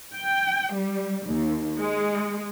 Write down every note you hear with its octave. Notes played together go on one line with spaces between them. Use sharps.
G5
G3
D#2
G#3